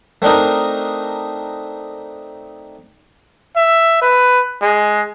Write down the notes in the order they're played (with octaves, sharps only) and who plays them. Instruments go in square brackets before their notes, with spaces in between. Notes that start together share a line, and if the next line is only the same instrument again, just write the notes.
[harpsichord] A3 C4 D4 D#4 A#4
[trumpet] E5
B4
G#3